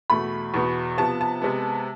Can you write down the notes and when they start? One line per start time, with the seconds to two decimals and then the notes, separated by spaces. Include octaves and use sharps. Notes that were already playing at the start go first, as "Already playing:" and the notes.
0.10 E2 B2 A3 B5
0.54 E2 B2 B3
0.98 C3 F3 B3 A5
1.21 A5
1.42 C3 G#3 B3